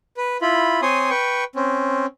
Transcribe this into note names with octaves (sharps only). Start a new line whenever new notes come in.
B4
E4 F4 B5
C4 C#5 G#5 C6 D#6
B4 G5 C#6
C4 C#4